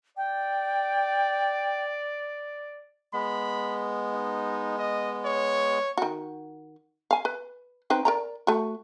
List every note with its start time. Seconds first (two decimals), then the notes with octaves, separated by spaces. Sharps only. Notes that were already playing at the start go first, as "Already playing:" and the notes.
0.17 D5 G5
3.13 G#3 B3 B5
4.12 D#4
4.79 D#5
5.25 C#5
5.97 D#3 F#4
7.11 F5 G#5
7.25 B4
7.90 C4 D#4 B4
8.05 A#4 D5 A#5
8.47 A3 F#4